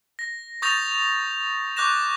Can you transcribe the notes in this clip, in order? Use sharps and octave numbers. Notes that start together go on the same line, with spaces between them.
A#6
C#6 D#6 G6 A6 A#6 F7
C#6 D6 F#6 G6 A#6 E7